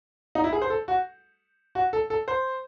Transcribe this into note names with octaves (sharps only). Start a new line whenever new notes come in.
D#4
E4
G#4
C5
A4
F#4
F#4
A4
A4
C5